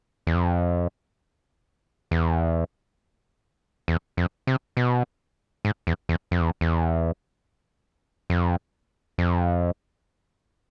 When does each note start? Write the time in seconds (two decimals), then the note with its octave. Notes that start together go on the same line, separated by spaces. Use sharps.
0.27 E2
0.35 F2
2.11 E2
3.88 E2
4.17 F2
4.47 C3
4.77 B2
5.65 G#2
5.87 E2
6.09 E2
6.31 F2
6.41 E2
6.61 E2
8.30 F2
9.18 F2